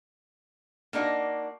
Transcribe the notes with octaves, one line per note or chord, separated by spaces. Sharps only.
A#3 D4 D#4 F#4